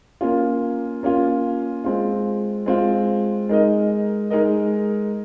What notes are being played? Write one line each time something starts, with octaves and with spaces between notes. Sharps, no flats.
A#3 C#4 F4
A#3 C#4 F4
G#3 C4 F4
G#3 C4 F4
G#3 D#4 A#4 D#5
G#3 D#4 A#4 D#5